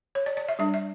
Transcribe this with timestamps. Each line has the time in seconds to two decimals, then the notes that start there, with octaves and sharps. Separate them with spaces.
0.15 C#5
0.26 D5
0.37 D5
0.48 E5
0.59 G3 D4 E5
0.74 E5